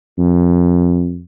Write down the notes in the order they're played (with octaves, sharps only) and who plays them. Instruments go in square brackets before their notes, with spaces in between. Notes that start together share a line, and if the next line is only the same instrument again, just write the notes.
[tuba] F2